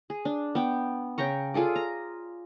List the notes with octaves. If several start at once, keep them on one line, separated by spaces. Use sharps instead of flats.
G#4
D4
B3 G5
C#3 G5 A#5 C#6
F4 G#4 A4 D5
A#5